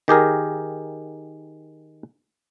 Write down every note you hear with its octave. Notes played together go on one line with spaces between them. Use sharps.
D#3 G4 G#4 A#4